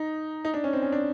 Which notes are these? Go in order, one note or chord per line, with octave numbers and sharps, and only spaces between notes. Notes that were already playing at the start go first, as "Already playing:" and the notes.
Already playing: D#4
D#4
D4
C#4
C4
C#4
D4